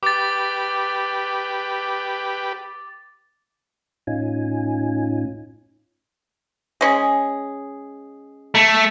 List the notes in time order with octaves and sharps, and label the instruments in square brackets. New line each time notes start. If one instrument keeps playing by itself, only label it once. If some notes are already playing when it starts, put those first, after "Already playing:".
[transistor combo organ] G4 B4 [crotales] D6 A6
[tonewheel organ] A2 C#4 D#4 F4 G#5
[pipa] G#3 C#4 G#4
[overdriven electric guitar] A3